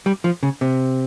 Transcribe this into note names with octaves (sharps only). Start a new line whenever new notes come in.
G3
F3
C#3
C3